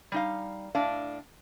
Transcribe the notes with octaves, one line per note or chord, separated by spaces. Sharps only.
G3 D#4 F5
A2 D4 F5